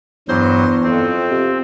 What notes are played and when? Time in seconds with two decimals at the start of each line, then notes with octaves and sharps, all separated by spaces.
0.28 E2 G2 F#3 C5
0.84 F2 C4
1.31 C3